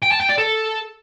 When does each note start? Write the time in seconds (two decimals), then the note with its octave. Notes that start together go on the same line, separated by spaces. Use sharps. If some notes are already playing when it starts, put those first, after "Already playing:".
0.02 G5
0.11 A5
0.20 G5
0.29 D5
0.38 A4